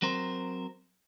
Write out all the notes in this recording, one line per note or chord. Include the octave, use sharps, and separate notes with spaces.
F#3 C4 A#4 C5